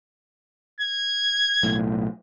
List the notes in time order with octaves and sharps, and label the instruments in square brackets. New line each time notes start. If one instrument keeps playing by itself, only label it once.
[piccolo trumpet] G#6
[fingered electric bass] B1 A2